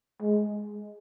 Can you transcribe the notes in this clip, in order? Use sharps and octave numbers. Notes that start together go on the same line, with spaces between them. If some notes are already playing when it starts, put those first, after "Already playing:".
G#3